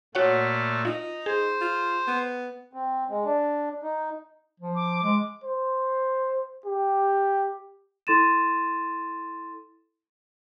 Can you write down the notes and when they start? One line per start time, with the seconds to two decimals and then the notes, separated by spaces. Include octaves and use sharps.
0.15 A#2 A3 F#4 C#5 F#5
0.85 D#4 F4
1.26 G#4 C5
1.61 F4
2.07 B3
2.73 C4
3.09 G#3
3.25 D4
3.82 D#4
4.60 F3
4.75 D6
5.03 G#3
5.44 C5
6.65 G4
8.07 E4 A4 C6 A6 D#7 E7